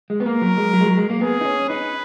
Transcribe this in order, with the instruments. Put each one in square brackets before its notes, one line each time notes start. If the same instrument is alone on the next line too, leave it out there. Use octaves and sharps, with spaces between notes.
[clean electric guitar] G#3
B3
[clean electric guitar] A#3 [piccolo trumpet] A#4
[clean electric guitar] F#3
G#3
F#3
G#3
F#3
G#3
A#3
[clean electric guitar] B3 [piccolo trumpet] G#4
[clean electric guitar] D#4
C#4
[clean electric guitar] D#4 [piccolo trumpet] B4